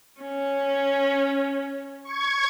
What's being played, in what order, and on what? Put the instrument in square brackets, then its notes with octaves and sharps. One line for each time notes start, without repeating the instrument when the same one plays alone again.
[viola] C#4
[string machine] C#6 G#6